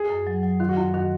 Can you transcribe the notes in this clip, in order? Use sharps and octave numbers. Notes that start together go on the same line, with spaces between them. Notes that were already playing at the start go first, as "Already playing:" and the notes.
Already playing: G#4
F#2
F#3
F#3
D#3 F4
F#4
F#2 F4
D#3 F#4